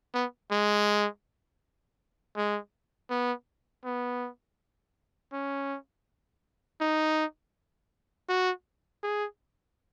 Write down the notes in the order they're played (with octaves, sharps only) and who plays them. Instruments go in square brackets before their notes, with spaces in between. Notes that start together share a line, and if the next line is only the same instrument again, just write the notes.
[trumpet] B3
G#3
G#3
B3
B3
C#4
D#4
F#4
G#4